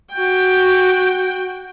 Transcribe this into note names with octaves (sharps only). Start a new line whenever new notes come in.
F#4 G5